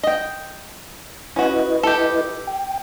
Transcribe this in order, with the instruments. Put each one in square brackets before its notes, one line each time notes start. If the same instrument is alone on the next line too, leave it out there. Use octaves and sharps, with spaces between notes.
[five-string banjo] D#5 G5
[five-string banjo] C#4 F#4 [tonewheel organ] E4 B4 D#5
[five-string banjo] G4 A4
[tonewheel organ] G5